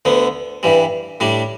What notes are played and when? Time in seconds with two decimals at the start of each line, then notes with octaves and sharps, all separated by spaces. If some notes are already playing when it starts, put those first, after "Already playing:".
0.05 D2 D3 B3
0.63 G2 E3 G3
1.20 A2 G3 D4